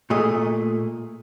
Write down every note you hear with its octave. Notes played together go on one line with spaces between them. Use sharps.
A#2 A3 G#4 D#5